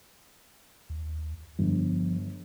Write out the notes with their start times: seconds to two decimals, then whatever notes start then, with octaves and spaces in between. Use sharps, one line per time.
0.90 D#2
1.59 G1 F3